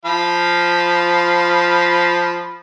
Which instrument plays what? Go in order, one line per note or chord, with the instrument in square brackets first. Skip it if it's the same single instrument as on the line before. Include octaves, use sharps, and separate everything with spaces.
[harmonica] F3 F5 B5